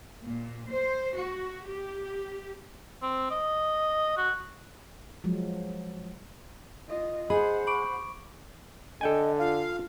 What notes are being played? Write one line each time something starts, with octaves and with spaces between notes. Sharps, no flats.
A#2
C5
F#4
G4
C4
D#5
F#4
F3 F#3 G#3
F4 D#5
G#4 C5 D#5 F#5 B5
B5 C#6 D6 D7
D3 A4 D#5 G5 G#5
F4 F5